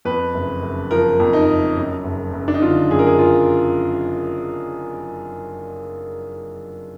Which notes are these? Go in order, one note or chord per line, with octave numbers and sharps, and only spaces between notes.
F2 B4
F#1
F#1
F3 A#4
F2
D#4
F#1
F#2
F#1
F#1
D4
D#4
D3 F4
F#2 G#4
A#4
G#4
F#1 F4